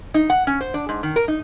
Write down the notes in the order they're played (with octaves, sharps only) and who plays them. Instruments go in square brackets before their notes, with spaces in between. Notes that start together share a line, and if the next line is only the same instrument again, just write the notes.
[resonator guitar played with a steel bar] D#4
F#5
C#4
C5
D4
G#2
D#3
A#4
D#4